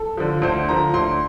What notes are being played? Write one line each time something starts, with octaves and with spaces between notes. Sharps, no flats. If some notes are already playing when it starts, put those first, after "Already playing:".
Already playing: A4
D3 F3
D2 C5
D3 F3 A#5
D2 C6